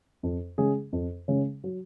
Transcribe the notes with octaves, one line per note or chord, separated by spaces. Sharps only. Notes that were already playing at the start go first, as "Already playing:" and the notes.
F2
C#3 G#3 C#4 G#4
F2
C#3 G#3 C#4 G#4
F#3